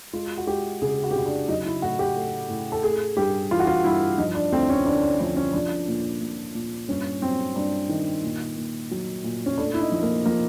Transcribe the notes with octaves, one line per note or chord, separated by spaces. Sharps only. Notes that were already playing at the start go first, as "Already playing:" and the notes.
G#3 F4
F#4
G#3 G4
C#3 G#4
F#4
G4
C#3 F#4
D4
F#3 D#4
E4
A2 F#4
G4
A3
A2
A4
A3 G#4
G2 G4
E3 F4
F#4
F4
G2 E4
F3 D#4
D4
D2 C4
C#4
D3 D4
D4
F3 D4
C#4
F3 D4
A#2
A#2
A#2
G2 C#4
F#3 C4
G2 D4
D#3
A#2
A#2
F#3
A#2
C#4
A3 D4
E4
D#4
F3
A#3
F3 A#3